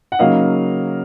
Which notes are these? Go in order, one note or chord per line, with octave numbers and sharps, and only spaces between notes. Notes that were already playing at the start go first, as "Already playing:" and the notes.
F#5
C#3 F#3 A#3 D#4 D#5 F5